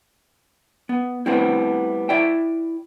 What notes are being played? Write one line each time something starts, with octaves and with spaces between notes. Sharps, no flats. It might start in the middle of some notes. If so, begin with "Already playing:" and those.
B3
G3 A3 B3 C4 E4
E4 D5 E5 G5